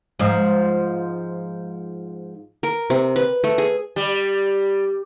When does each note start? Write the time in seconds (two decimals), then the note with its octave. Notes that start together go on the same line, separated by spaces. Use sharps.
0.19 G#2 F3
2.63 A#4
2.90 C3
3.16 B4
3.44 A3
3.58 G#4
3.96 G3